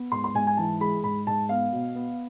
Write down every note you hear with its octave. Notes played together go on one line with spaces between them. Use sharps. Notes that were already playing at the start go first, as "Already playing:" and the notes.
Already playing: B3
G#2 C6
C6
G#2 G#5
G#5
E3 A5
G#3 B5
G#2 B5
G#2 A5
B3 F5
B2
B3